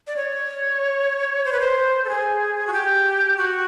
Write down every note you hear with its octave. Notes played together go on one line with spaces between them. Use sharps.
D5
C#5
C5
B4
C5
A4
G#4
F#4
G4
F#4